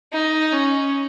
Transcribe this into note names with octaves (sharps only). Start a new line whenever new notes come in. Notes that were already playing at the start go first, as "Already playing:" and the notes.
D#4
C#4